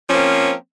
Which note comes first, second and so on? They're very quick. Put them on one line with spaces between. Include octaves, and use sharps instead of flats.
F3 C#4 A#3 C4